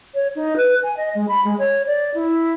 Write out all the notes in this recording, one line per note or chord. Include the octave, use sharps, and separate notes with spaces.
C#5
D#4
B4
G#5
D#5
G#3
B5
G#3
C#5
D5
E4